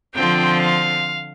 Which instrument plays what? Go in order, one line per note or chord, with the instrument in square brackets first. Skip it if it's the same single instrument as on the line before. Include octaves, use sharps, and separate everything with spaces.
[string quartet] D3 F3 C4 F4 G5
F5